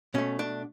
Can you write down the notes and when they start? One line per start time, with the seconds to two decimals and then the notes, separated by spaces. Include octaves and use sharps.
0.14 B2 A3 C#4
0.39 D4